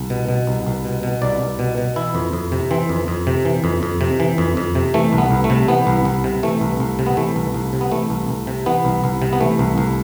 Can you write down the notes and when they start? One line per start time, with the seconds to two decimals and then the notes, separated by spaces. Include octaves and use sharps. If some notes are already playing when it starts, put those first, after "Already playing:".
Already playing: C2
0.10 B2
0.29 B2
0.47 C2
0.67 C2
0.85 B2
1.03 B2
1.22 C2 D5
1.41 C2
1.59 B2
1.78 B2
1.96 E3 E4
2.15 F2
2.33 F2
2.52 C3
2.71 E3 C4
2.89 F2
3.08 F2
3.27 C3
3.45 E3
3.64 F2
3.83 F2
4.01 C3
4.20 E3
4.38 F2
4.57 F2
4.75 C3
4.94 E3 A3
5.13 C2
5.18 B3
5.31 C2
5.44 A3
5.50 C3
5.68 E3 B3
5.87 C2
6.05 C2
6.24 C3
6.43 E3 A3
6.61 C2
6.80 C2
6.99 C3
7.06 B3
7.17 E3 A3
7.36 C2
7.54 C2
7.73 C3
7.81 B3
7.91 E3 A3
8.10 C2
8.29 C2
8.47 C3
8.66 E3 B3
8.85 C2
9.04 C2
9.22 C3
9.33 B3
9.40 E3 A3
9.59 C2
9.78 C2